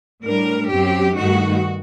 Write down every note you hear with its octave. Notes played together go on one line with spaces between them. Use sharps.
A2 G3 D4 A#4
F#2 F#3 C4 G4
G2 D#3 A3 D#4 F#4